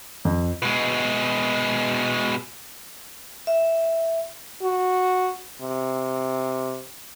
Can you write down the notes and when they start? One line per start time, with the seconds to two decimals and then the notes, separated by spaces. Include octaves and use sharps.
0.25 F2
0.62 B2 G#3
3.47 E5
4.61 F#4
5.61 C3